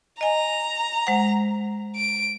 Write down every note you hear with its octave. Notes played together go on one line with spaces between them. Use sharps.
D#5 G#5 A#5
G#3 C5 F#5
D7